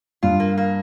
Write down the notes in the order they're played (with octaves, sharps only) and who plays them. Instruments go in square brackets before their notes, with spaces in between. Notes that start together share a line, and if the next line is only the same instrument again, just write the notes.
[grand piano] G2 [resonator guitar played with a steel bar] F4
[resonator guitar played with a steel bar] A#3
A#3